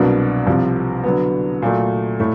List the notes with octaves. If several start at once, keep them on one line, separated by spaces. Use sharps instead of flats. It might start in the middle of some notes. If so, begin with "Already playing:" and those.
Already playing: C2 B2 F#3 A#3 D4
C2 C3 F3
D3 F#3 B3
A#2 F#3 A3
A2 A3